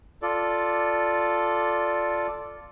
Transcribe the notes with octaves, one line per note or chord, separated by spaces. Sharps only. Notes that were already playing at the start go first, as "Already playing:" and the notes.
F4 A4 D5